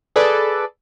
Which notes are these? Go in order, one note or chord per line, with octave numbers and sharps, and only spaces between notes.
G#4 A4 B4 D5